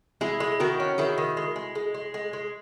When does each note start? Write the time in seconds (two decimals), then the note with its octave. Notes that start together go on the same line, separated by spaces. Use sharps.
0.21 G#3 E4 G#4
0.40 G#3
0.60 D#3 F#4 A#4
0.80 C#4
0.98 D#3 E4 G#4
1.18 D#3
1.37 G#3
1.56 G#3
1.75 G#3
1.94 G#3
2.14 G#3
2.33 G#3